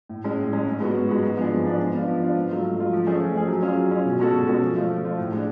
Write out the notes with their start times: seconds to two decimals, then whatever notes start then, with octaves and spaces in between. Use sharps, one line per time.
0.09 A2
0.24 G#3 C#4
0.39 A2
0.53 G#3 C#4
0.67 G#2
0.80 G#3 B3 F#4
0.94 G#2
1.09 G#3 B3 F#4
1.23 G#2
1.37 F3 B3 D4 G#4
1.52 G#2
1.65 F3 B3 D4 G#4
1.80 F3
1.94 B3 D4 F4
2.08 F3
2.22 B3 D4 F4
2.36 G#2
2.50 F#3 A3 F4
2.64 G#2
2.78 F#3 A3 F4
2.93 F3
3.07 A3 C#4 G#4
3.21 F3
3.35 A3 C#4 G#4
3.48 F#3
3.62 C#4 F4 G#4
3.77 F#3
3.91 C#4 F4 G#4
4.06 B2
4.19 G#3 C#4 F#4 A4
4.33 B2
4.47 G#3 C#4 F#4 A4
4.61 F3
4.76 A3 F4
4.90 F3
5.05 A3 F4
5.18 A2
5.32 G#3 D4